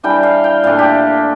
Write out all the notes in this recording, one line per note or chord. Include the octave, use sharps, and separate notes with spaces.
E3 G3 D4 G5
F5
G5
A#2 A3 D4 F5
G4